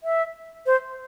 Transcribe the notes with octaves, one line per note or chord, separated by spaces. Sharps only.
E5
C5